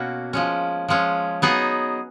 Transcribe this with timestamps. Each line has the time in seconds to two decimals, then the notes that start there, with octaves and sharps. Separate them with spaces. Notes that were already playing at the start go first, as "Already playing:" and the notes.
Already playing: B2 A#3 C#4 F#4
0.33 F3 G#3 C#4
0.88 F3 G#3 C#4
1.42 F#3 B3 D#4 G#4